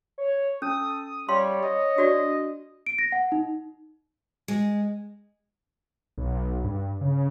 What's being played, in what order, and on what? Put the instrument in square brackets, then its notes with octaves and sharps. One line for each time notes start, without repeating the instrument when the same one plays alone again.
[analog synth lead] C#5
[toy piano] C#4 [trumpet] A4 [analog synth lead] D#6
[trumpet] G3 [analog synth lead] C#5 [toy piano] F5 C6
[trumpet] D#5
[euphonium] D4 [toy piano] F#4 D5
[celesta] D7
A#6
F#5
D#4
[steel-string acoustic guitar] G#3
[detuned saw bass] B1
G2
C#3